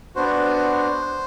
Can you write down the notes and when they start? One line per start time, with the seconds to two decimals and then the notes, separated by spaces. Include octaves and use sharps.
0.16 B3 D4 F#4 C5